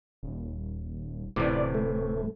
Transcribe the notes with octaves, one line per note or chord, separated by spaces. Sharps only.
D#1
D1 A2 C3 E3 D5
A3